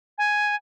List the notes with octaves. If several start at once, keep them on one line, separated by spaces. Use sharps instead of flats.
G#5